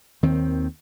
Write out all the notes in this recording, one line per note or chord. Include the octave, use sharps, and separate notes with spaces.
D#2 D#3 C4